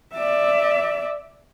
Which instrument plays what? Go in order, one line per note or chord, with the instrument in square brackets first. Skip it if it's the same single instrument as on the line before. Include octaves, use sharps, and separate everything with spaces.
[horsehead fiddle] D5 E5